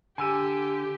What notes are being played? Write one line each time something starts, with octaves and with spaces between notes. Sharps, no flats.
D3 G4 G#5 E6 D#7